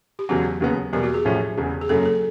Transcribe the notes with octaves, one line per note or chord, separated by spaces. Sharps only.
G4
E1 E2 C#3 F#3 F#4
D#2 C#3 F#3 B3
E2 B2 G3 A#3 G4
F#4
G#4
A1 A2 F3 A3 C#4
E1 E2 C#3
G#4
F#1 F#2 C#3 F#3 A4
A4